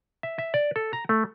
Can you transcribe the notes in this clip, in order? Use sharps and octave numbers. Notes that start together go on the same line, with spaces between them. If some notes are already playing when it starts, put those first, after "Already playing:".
E5
E5
D5
A4
A#5
A3